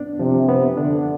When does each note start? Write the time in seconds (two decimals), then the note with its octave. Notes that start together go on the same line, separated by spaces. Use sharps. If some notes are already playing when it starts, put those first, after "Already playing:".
Already playing: B3 D4
0.19 C3 F3
0.49 B3
0.77 D3 D4